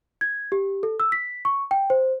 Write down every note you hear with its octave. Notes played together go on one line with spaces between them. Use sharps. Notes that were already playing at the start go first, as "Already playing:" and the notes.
G#6
G4
A4
E6
B6
C#6
G5
C5